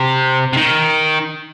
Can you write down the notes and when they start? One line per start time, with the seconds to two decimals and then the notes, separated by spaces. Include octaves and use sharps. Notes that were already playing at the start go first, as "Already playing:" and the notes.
Already playing: C3
0.53 C3
0.57 D#3